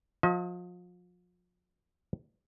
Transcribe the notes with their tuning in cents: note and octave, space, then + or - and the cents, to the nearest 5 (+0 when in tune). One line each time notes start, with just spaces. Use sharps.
F3 +35 D#5 +40